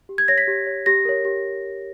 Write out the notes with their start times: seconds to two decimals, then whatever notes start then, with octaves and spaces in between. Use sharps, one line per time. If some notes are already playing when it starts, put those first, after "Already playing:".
0.09 G4
0.18 G#6
0.28 C#5 A#6
0.38 B6
0.48 G4
0.67 C#5
0.86 G4 A#6
1.05 A#4 C#5
1.25 G4